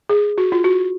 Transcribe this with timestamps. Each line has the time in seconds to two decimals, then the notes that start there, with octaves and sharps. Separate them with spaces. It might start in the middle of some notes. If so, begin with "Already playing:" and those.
0.09 G#4
0.38 F#4
0.52 F4
0.64 F#4